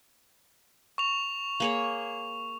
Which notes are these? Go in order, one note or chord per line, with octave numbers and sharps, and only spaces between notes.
C#6 F7
A#3 G#4 C#5